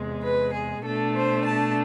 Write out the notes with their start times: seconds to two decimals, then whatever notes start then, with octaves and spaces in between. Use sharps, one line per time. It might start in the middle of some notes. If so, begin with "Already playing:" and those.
Already playing: E2 C3 G#3
0.24 B4
0.55 G#4
0.85 B2 A3 D4 A4
1.16 C5
1.47 A5